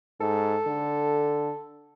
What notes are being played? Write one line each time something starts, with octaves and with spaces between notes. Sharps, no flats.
G#2 A4
D3